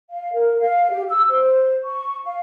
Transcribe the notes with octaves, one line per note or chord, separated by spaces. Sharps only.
F5
A#4
F5
G4
E6
C5
C#6
F5